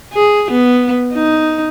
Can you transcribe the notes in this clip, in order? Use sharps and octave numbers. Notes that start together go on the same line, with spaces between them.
G#4
B3
D#4